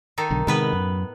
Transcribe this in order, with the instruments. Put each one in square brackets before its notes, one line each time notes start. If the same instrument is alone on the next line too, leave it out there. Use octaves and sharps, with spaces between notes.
[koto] D#3 D#4 A4
[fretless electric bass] B1 D3
[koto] A2 B3 B4 [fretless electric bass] C3 D#3 G#3
[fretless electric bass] F#2